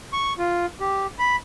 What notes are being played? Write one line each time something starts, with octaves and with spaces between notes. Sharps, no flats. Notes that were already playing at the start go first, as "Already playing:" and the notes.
C#6
F4
G4
B5